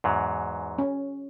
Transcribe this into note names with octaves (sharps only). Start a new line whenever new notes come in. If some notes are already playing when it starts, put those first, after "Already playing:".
E2 G#2 F#3
C#4